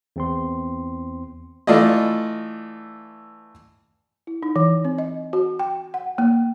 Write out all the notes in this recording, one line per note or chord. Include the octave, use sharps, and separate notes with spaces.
E2 C4 C6
E3 A3 F4 D5 D#5
E4
D#4
E3
C4
D#5
F#4
G5
F#5
A#3